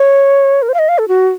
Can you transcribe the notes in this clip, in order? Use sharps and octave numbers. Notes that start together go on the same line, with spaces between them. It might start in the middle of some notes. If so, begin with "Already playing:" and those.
Already playing: C#5
A#4
C5
F5
D#5
F5
A4
F#4